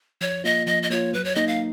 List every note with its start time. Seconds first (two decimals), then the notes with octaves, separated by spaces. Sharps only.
0.21 F3 C#5
0.44 A#3 F4 D#5
0.67 F3 D#5
0.83 D#5
0.90 A#3 F4 C#5
1.13 F#3 B4
1.25 C#5
1.35 A#3 D#4 D#5
1.48 F5